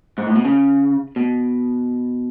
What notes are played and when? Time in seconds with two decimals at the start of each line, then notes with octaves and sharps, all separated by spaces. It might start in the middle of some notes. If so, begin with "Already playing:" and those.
0.18 G#2
0.27 A2
0.36 B2
0.45 C#3
1.16 B2